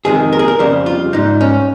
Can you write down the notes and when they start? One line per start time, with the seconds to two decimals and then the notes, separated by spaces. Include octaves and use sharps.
0.05 F2 C3 D#3 G#3 G#4
0.33 A#4
0.39 G#4
0.48 A#4
0.59 F2 C#3 G3 C5
0.86 F4
1.13 G#2 G3 D#4
1.41 C#4